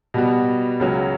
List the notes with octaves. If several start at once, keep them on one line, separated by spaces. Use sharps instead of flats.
B2 G3 B3 F#4
C#2 C#3 F#3 C#4 F#4